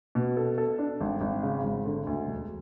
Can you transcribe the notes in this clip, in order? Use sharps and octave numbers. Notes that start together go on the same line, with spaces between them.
B2
A4
A4
D4
G#1
G#1
C#3
G#1
D3
D2
E1